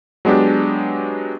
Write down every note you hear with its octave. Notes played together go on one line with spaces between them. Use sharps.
F#3 G#3 B3 D4 G4